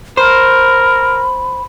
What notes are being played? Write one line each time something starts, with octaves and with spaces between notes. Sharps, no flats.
A#4 C5 B5